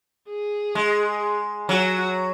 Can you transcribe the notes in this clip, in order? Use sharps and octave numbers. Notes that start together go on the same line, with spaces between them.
G#4
G#3
F#3 F#4